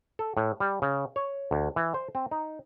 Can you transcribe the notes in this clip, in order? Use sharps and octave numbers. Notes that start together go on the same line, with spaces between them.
A4
A2
G3
C#3
C#5
D2
E3
C5
C4
D#4